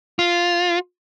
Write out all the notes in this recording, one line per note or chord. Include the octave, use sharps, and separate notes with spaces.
F4